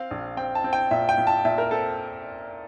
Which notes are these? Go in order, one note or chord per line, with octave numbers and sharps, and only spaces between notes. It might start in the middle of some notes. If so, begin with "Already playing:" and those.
Already playing: C4 F5
A#1
C4 G5
A5
C4
G5
A#2 E5
G5
A#2
A5
A#2 E5
A#4
C4 A4